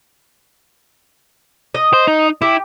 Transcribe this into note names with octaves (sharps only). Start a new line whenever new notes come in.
D#5
C5
D#4
E4 G4